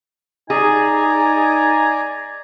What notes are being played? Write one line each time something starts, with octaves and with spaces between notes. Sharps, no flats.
D#4 G#4 D5 G#5 A#5